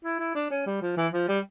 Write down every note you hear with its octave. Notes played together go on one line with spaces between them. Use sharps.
E4
E4
D4
C#4
G3
F3
E3
F3
G3